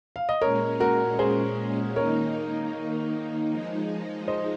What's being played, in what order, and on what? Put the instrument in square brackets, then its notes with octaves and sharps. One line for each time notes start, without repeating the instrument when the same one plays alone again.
[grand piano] F5
D#5
[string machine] A#2 G#3 C#4 [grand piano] A#4 C#5
[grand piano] F#4 A#4
G#4 C5
[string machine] D#3 A#3 D#4 [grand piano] A#4 C#5
[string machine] F3 G#3 D#4
[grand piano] C5 D#5